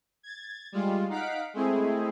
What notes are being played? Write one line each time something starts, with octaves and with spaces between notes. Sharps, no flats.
G#6 A6
G3 G#3 F4
D#4 F5 F#5 B6 D7
G#3 A3 C4 E4 G#4